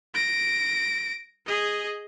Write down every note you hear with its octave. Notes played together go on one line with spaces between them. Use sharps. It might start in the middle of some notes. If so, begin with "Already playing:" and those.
A#6 D7
G#4 D#5